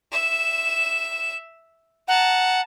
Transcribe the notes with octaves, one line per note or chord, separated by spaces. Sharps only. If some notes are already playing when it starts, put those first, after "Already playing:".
E5 E7
F#5 A5 A#5